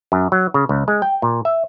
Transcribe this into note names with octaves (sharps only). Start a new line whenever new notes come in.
F#2
F#3
C#3
C#2
G#3
G5
A#2
E5